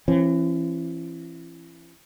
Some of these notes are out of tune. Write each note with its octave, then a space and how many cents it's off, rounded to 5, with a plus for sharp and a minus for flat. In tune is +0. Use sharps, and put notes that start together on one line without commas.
E3 +30 C#4 -45